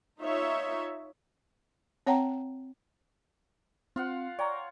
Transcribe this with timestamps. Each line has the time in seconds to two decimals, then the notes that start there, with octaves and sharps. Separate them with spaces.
0.20 D#4 F4 C#5 E5
2.07 C4 C#5 F#5 G5 A#5
3.96 C4 F4 F5 F#5
4.39 C#5 D5 G5 A#5